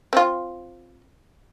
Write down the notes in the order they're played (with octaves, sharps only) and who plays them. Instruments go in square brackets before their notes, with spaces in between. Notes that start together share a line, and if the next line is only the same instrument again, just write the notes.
[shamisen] C4 F4